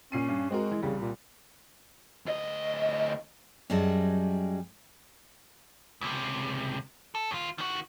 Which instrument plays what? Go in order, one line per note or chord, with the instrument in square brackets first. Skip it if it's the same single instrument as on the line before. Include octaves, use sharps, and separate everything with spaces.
[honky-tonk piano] A#2 C7 D#7 [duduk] C#4
[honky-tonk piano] G2
[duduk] G#3 [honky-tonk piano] C4 F#4 A#4
[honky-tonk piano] E3
[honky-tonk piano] C2 G3 [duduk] C#3
[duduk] A#2
[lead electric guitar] D2 D#5
[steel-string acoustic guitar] F#2 F#3 G3 G#4 D#5 A5
[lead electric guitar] C#2 C3
A4
D#2 F4
D#3 F#4